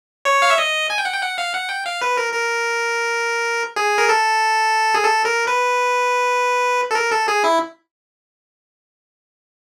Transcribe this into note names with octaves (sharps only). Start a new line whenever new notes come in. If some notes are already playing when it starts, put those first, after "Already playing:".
C#5
F5
E5
D#5
G#5
G5
F#5
G5
F#5
F5
F#5
G5
F5
B4
A#4
A#4
G#4
A#4
A4
G#4
A4
A#4
B4
A4
A#4
A4
G#4
E4